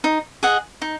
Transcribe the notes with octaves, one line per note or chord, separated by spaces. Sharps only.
D#4
G#4 D#5 F#5
D#4